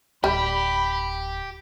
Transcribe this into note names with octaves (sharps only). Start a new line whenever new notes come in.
D1 D2 G3 G4 B5